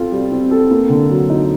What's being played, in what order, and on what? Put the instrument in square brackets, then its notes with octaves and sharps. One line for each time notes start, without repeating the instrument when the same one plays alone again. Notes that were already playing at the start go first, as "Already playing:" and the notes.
Already playing: [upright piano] C4 F4 A4
G3
C4
A4
A#3
D3
F#3
D#4